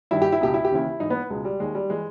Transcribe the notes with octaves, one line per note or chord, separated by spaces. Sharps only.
G2 D#3 E4
G4
E4
C#2 B2 G4
E4
G4
D#2 C#3 E3 E4
G#2 E3 D#4
B3
C#2 B2 G#3
G3
D#2 D#3 G#3
G3
E3 G#3